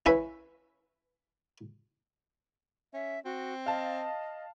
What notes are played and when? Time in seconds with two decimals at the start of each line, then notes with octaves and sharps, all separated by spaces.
0.06 C#4 E4 B4
2.94 C#4 E5
3.25 C4 F#4
3.66 D#5 F5 A5